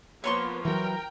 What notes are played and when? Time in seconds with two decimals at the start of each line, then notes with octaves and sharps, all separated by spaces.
0.24 F3 A#3 B3 C#5 C6 C#6
0.65 E3 F#3 A#4 G5